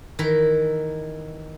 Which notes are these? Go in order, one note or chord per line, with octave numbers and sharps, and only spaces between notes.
D#3 E3 E4 A#5